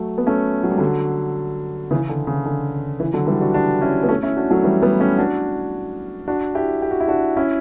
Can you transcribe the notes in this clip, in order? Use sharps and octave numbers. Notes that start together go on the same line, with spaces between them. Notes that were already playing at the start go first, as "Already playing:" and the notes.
Already playing: F#3 A3
B3
A3 C#4
F#3
G3
D3 F#3
C#3 E3
D3
C#3
D3
C#3 E3
D3 F#3
E3 G3
D4 F#4
D4 F#4
C#4 E4
B3
A3 C#4
C#4 E4
D4 F#4
F#3 A3
E3 G3
G3 B3
A3 C#4
D4 F#4
D4 F#4
E4 G4
G4
F#4
E4
D4 F#4
C#4 E4